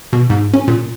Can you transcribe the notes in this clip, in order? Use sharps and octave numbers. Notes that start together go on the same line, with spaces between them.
B2
G#2
C#4
A#2